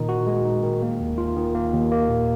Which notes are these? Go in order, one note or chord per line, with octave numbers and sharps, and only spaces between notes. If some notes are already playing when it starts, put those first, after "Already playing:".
Already playing: A#2 D#3 D#4
F#4
G#3
D#4
D#3
A#3
D#2
F4
D#3
A#3
D#2
A#3
A#2